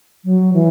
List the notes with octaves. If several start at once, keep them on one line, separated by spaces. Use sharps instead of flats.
F#3
E3